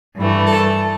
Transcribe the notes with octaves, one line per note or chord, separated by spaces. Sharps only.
G2 E3 A3
A4